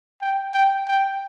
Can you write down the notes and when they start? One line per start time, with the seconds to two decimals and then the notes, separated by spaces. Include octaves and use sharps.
0.21 G5
0.54 G5
0.87 G5